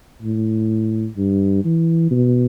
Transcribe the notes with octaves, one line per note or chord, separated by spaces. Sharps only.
A2
G2
E3
B2